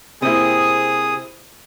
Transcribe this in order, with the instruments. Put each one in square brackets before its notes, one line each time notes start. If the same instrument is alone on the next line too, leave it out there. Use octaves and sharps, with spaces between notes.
[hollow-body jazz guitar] C3 A#3 [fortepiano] C4 E4 [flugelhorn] G#4 [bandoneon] D#6